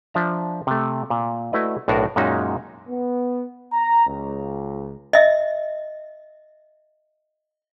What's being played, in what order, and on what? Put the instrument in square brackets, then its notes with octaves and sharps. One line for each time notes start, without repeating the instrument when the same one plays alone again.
[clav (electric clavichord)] F3 D4 E5 A#5
C3 A3
A#2
A3 E4 F#4 B4 D5 D#5
B1 A2 D4 F#4 A#4
F#2 A#2 G#3 C#4 D#4 F#4
[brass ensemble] B3
A#5
C#2
[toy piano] D#5 E5